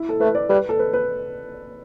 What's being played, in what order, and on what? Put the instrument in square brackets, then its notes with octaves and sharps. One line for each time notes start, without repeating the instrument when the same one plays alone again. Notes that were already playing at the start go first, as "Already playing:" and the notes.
Already playing: [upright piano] E4
A4
[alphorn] A3 [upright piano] B4
[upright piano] D5
[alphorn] G3 [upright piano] B4
[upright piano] A4
B4
B4